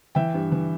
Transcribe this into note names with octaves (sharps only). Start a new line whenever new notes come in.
E3 E5 G5
G2
E3